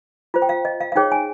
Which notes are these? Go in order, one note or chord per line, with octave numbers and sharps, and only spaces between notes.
F4 C5
G5
F5
D#5
F5
F5
D#4 G#4 C#5 G5
G#5